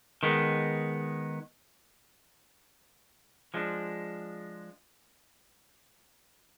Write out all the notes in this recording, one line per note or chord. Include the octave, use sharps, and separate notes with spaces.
D#3 G#3 B3
F3 G#3 D4